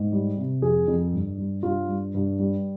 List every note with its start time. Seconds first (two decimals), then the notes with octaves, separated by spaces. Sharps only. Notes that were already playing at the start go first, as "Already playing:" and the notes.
Already playing: G#2
0.12 G3
0.37 C3
0.62 F2 G#4
0.88 F2
1.14 G2
1.38 G3
1.63 G2 F4
1.89 G3
2.15 G2
2.39 G3